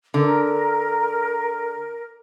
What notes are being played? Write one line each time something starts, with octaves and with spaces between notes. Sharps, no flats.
D3 A#4